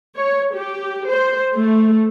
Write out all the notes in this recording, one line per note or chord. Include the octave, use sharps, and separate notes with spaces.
C#5
G4
C5
A3